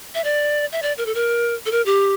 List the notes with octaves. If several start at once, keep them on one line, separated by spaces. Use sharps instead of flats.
E5
D5
E5
D5
A#4
A4
A#4
A4
A#4
G4